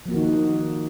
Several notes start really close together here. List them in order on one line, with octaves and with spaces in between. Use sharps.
F3 A#3 F#4 D#3 D#4